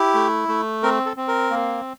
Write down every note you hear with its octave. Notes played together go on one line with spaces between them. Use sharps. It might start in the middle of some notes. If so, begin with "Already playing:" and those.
Already playing: E4 G4
A3
A3
C4 A#4
A4
C4
A#4
A#3